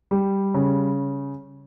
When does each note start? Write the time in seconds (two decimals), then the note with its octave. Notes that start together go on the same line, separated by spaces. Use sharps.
0.11 G3
0.54 C#3